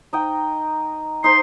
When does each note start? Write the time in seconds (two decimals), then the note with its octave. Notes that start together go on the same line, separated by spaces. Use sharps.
0.13 D#4 D#5 G5
1.24 D#4 C5 C6